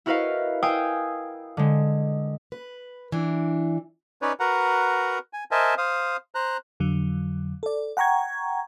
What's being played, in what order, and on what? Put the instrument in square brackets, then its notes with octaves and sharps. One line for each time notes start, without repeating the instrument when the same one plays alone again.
[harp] E4 F#4 A#4 B4 D#5 F5
F5 G5 G#5 D#6 E6 G6
D3 G#3
[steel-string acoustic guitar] B4
E3 D4
[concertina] C#4 D#4 B4 C#5 D5
F#4 A#4 B4 F#5 A#5
G#5
A#4 C5 D#5 E5 G#5 A5
C5 F5 D#6
C5 A#5 F#6
[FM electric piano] F2 D3 F#3
A4 D5
F#5 G5 A#5 C#6 G#6